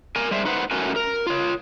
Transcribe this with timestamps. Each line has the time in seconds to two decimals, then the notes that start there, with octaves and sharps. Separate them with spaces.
0.16 A#4 G#5
0.31 G3 G#3 C5 E5
0.45 D#4 B4 C5 F#5
0.71 A3 C#4 F#4 A#4 G#5
0.96 A#4
1.27 F4 C#5